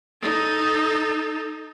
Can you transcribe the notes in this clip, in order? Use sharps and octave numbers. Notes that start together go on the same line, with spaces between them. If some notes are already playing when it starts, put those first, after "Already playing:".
D#4 A4